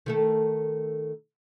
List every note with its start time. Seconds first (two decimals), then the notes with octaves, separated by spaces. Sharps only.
0.06 D#3 A3 A4